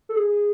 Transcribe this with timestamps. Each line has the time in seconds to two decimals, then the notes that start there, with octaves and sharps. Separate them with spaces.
0.09 A4
0.16 G#4